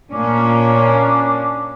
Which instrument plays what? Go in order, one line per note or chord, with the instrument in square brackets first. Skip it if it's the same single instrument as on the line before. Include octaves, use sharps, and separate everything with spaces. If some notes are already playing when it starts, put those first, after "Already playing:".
[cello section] A#2 A#3 C#4 [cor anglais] D4